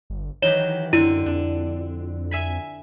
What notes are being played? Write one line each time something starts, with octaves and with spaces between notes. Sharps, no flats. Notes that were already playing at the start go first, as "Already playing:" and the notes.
G1
D#3 E3 F#3 G4 C#5 E7 G7
F#2 D3 C4 E4 D#7
F2 D4
E5 G#5 B5